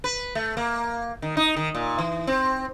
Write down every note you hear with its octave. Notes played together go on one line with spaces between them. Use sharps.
B4
A3
A#3
D#3
D#4
D#3
A#2
E3
C4